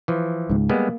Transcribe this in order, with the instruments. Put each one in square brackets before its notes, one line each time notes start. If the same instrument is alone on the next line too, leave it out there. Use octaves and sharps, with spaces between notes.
[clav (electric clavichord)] E3 F3
[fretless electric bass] C#2 G#2
[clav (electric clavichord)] G3 G#3 B3 [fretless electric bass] A#3